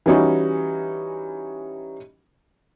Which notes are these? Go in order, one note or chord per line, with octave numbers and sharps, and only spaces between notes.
E3 G3 C#4 D#4 F#4